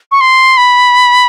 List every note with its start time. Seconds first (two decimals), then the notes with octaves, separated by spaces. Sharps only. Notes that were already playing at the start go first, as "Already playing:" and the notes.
0.12 C#6
0.21 C6
0.57 B5